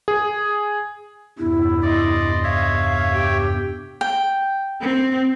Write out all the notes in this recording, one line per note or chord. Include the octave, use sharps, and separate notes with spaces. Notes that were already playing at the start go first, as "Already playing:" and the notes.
G#4
E2 G2 C3 E4
D5 D#5 C6
C#5 E5 F5
G4 G5
G5
C4